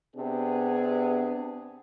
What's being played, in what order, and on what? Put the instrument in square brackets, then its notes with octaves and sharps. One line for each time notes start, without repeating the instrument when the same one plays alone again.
[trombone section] C3 B3 D4 G#4